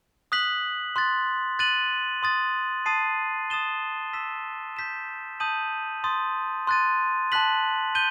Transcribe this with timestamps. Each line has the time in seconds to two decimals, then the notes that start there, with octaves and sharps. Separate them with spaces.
0.32 D#6 F#6 B6 F#7
0.96 C6 F#6 A6
1.59 F#6 A6 D#7 F#7
2.23 C6 D#6 A6
2.86 A5 D#6 A6 C7 D#7
3.50 D#6 A6 E7 G7
4.13 E6 B6 E7
4.77 G6 B6 E7
5.40 A5 D#6 G6 D#7 F#7
6.04 C6 D#6 A6
6.67 C6 F#6 A6 D#7
7.32 A5 C6 F#6 B6 F#7
7.95 G6 D#7 G7